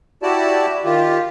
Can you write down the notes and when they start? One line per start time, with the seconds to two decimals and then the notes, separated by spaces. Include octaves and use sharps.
0.22 E4 F#4 G4 D5 A5
0.85 D#3 F4 G4